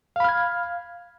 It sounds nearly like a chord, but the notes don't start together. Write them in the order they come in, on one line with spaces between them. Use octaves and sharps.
F5 B5 F6 G#6